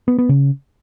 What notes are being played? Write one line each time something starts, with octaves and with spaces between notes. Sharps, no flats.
B3
B3
C#3